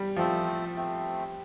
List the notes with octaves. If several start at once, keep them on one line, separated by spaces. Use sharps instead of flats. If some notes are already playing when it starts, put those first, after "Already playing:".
Already playing: G3
F3 A3 C4 A4 C5
A3 C4